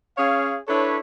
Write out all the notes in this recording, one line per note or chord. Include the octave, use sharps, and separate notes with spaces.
C#4 G#4 C#5 F5
D4 E4 A4 B4 C#5